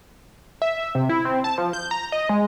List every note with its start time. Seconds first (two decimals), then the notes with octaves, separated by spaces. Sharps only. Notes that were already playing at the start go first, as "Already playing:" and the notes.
0.62 E5
0.95 C3
1.09 E4
1.25 C4
1.44 A5
1.58 F3
1.73 G6
1.91 A#5
2.12 D#5
2.29 G#3